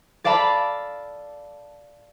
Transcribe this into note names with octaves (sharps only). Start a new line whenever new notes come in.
A4 D5 F5 A5 B5